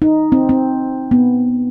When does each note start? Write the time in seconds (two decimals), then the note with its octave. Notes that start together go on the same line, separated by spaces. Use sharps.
0.02 D#4
0.32 C4
0.49 C4
1.11 B3